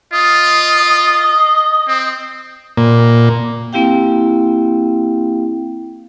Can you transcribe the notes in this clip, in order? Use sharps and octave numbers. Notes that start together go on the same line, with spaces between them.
F4 D#5
C4
A#2
A#3 C4 E4 G4 F5 G5